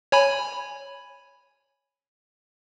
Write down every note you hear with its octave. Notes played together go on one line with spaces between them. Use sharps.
C#5 G#5 B5